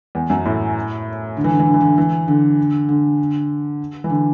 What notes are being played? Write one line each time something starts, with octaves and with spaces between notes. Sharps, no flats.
E2
F#2
A2
D3
E3
D3
E3
D3
E3
D3
E3
D3
D3
E3
D3